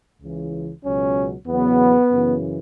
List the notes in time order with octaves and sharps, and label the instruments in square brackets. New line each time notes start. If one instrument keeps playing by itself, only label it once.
[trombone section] C#2 C#3 E3
C#2 B2 F#3 C#4
E2 C#3 F#3 B3
F#2 C#3 E3